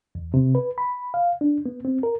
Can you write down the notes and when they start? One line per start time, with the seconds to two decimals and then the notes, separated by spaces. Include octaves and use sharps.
0.15 E2
0.34 C3
0.55 B4
0.78 B5
1.14 F5
1.41 D4
1.66 B3
1.85 C4
2.03 A#4